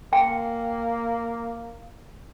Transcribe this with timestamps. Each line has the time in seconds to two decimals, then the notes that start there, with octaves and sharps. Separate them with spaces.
0.13 A#3 G5